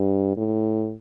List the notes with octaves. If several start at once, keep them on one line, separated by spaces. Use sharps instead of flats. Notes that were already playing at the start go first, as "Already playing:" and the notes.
Already playing: G2
A2